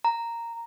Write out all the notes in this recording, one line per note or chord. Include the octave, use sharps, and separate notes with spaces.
A#5